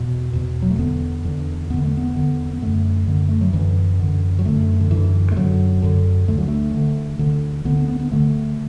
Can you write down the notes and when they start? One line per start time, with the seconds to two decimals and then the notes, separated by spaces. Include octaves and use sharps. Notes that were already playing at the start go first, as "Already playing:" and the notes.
Already playing: E2 B2
0.33 E2 B2
0.62 F#3
0.70 A3
0.79 E2 D3 B3
1.25 E2 D3
1.70 E2 D3 B3
1.84 A3
1.97 B3
2.16 E2 D3
2.53 B3
2.62 F#2 D3 A3
3.07 F#2 D3
3.29 A3
3.41 F#3
3.53 F#2 D3 E3
3.99 F#2 D3
4.39 F#3
4.45 F#2 D3 A3
4.80 D3
4.91 F#2 D3 E3
5.32 A3
5.36 F#2 D3 F#3
5.82 F#2 D3
6.28 D2 D3 A3
6.38 F#3
6.48 A3
6.74 D2 D3
7.19 D2 D3
7.65 D2 D3 B3
7.77 B3
7.88 B3
7.99 B3
8.11 D2 D3 A3